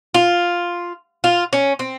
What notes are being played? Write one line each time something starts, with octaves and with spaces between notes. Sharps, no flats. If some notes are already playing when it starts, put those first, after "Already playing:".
F4
F4
C#4
C4